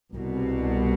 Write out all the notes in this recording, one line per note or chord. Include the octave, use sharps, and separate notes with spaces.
C2 B2